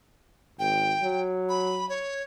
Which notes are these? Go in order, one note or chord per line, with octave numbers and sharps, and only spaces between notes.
G#1 G5
F#3
B5
C#5